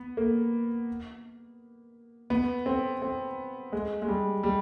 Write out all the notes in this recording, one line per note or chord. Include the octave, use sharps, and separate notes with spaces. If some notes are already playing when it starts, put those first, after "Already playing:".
Already playing: B3
A#3
B3
C4
C4
G#3
G#3
G3
G3